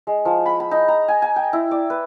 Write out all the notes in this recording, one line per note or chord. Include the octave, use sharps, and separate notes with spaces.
G#3
F3
B5
B5
D#4
A#5
G#5
G#5
G5
E4
D5
B4